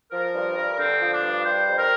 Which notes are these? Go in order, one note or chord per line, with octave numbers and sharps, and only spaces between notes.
F3 A#4
G2
G2
D3 C4
F3
D4
G2
G3 C5
F2
A#4